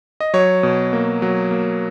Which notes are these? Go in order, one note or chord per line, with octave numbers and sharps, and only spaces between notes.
D#5
F#3 C#5
B2
A#3
F#3
A#3